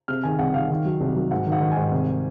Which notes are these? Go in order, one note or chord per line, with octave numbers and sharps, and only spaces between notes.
C3 F6
D#3 G#5
C2 F#5
D#3 F5
D#3
F#3
C2
F#3
G#2 F#5
D#3
F#5
D#3
G#5
G#2
C2